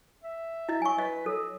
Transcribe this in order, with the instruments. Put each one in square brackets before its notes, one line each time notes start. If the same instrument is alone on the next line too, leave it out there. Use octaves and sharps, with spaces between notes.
[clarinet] E5
[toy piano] E4 D#5
[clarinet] F#3 [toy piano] G#5 C#6
[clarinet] B4 [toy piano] D#5
[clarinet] F#3 [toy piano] A4